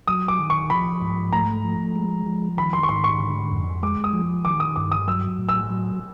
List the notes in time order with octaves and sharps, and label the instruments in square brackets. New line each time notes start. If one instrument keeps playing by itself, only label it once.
[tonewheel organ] F#3 [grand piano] D#6
[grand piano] D6
[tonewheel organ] D#3
[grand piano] C#6
[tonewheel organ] F3 [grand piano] B5
[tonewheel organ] G#2
[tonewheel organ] A3 [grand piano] A#5
[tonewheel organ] F3
G#3
F3
[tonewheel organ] D#3 [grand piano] B5
[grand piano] C6
C#6
[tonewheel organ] G#2 [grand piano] C6
[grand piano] C#6
[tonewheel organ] D3
F2
[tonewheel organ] G#3 [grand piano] D6
[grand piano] D#6
[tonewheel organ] F3
[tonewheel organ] D#3 [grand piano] D6
[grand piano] D#6
[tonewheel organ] G2 [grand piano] D6
[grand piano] D#6
[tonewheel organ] F#3 [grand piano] E6
[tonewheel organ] A2
[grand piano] E6
[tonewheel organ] F#3